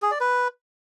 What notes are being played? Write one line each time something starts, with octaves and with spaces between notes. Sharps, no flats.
G#4
D5
B4